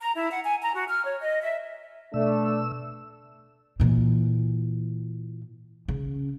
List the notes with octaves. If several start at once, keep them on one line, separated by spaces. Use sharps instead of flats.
A#5
E4
F#5
G#5
A#5
F#4
F6
C#5
D#5
E5
B2 A3 D4 E6
A#2 E3
C#3